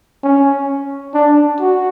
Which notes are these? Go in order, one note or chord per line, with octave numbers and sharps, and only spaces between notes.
C#4
D4
F#4